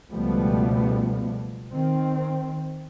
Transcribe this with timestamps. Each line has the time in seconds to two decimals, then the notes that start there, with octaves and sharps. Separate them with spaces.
0.12 C#2 B2 F3 G3 A3 B3
1.72 D#3 C4